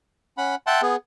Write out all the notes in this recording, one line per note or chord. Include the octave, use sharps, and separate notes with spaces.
C#4 F#5 B5
E5 F#5 G5 A5 C6
B3 G#4